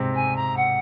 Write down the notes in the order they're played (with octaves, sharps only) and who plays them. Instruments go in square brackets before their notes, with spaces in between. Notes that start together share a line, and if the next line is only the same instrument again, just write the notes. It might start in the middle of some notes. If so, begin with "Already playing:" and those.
Already playing: [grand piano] G#2 C3 C4
[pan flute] G#5
A#5
F#5